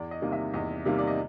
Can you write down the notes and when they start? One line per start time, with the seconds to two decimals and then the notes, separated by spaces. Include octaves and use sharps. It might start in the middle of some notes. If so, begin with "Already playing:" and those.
Already playing: E2 D5
0.11 D#5
0.22 C3 D#3 G3 A#3
0.32 E5
0.54 E2 D#5
0.85 C3 D#3 G3 A#3
0.98 D5
1.07 D#5